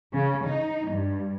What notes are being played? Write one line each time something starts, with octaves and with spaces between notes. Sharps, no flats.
C#3
D#4
G2